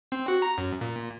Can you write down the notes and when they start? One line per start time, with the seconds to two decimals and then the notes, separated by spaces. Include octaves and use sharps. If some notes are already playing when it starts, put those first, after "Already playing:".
0.12 C4
0.28 F#4
0.42 A#5
0.58 F#2
0.81 A#2